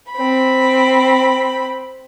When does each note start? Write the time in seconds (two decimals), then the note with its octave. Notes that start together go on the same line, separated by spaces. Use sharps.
0.13 C4 B5